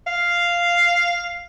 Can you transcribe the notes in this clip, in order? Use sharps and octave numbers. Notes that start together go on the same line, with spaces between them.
F5